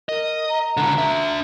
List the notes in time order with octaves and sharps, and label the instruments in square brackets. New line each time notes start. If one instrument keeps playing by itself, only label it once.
[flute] A#4 [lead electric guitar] D#5
[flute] A#5
[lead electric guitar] C#2 D3
D4 E5